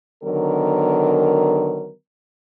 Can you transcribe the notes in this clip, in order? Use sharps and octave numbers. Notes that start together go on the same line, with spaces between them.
D3 D#3 F#3 B3 A#4